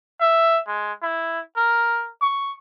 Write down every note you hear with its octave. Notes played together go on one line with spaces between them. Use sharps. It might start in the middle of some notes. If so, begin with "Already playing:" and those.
E5
G#3
E4
A#4
C#6